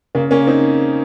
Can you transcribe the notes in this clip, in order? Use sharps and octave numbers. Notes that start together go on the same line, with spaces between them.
C#3 A#3
A#3 C#4
C4 D#4